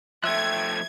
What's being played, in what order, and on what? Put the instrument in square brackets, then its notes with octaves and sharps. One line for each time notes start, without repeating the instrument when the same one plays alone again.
[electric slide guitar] F3 A3 [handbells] E5 [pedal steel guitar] G5 E6 F#6 [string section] G#6